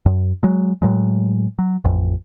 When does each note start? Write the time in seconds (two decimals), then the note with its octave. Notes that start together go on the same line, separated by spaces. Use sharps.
0.06 F#2
0.43 F#3 G#3
0.82 A2 F#3 G#3
1.59 F#3
1.84 A1 F2